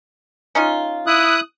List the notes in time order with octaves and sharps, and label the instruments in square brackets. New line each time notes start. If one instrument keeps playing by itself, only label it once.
[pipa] C#4 D#4 F4
[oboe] E4 [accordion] D#6 F#6